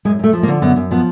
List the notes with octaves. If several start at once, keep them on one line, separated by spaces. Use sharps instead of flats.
F#2 G#3
F#2 A3
F3
A#3
D3
F#2 B3
F#2
F3 B3